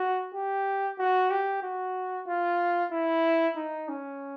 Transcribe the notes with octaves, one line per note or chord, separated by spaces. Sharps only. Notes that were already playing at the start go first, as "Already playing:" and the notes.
Already playing: F#4
G4
F#4
G4
F#4
F4
E4
D#4
C#4